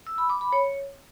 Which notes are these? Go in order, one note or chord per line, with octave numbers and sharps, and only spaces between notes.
E6
B5
D6
B5
C#5